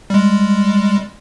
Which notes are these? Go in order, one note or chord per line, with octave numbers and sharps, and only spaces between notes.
G3 G#3